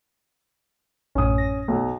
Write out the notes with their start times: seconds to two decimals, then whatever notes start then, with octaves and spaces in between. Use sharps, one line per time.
1.15 A1 F#2 A2 C#4 D#6
1.38 A#6
1.68 B1